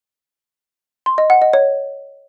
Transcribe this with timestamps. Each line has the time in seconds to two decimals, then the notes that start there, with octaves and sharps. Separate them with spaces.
1.06 C6
1.18 D#5
1.30 F#5
1.42 D#5
1.53 C#5